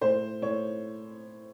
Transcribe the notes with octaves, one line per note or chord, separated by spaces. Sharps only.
A2 C5
A2 C#5